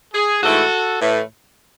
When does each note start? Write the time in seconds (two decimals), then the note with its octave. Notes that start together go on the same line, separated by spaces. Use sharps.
0.14 G#4
0.43 G#2 E3 A3 E4 F#4 A4
1.01 A2 E3 A3